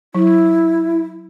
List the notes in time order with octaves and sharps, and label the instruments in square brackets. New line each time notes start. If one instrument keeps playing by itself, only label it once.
[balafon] F#3 [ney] E4